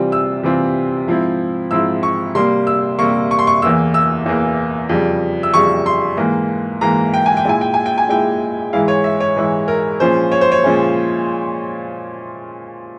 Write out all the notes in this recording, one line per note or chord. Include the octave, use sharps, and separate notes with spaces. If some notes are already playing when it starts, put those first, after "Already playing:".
Already playing: C3 E3 G3 C4 F4
E6
C3 E3 G3 C4 F4
G#2 F3 C4 E4
G#2 F3 C4 E4 E6
C#6
C3 G3 A#3 C6
E6
C3 G3 A#3 C#6
C#6
C6
C#6
E2 E3 A#3 E6
E6
E2 E3 A#3
F2 C#3 G3
E6
F2 C#3 G3 C#6
C6
G#2 E3 A#3
G#2 E3 A#3 A#5
G5
G#5
G5
A#2 G#3 E4 G#5
G5
G#5
G5
G#5
A#2 G#3 E4 G5
G#2 E3 G#3 E4 F5
C#5
E5
C#5
G#2 E3 G#3 E4
A#4
A#2 F3 G#3 C#4 C5
C#5
C5
C#5
A#2 F3 G#3 C#4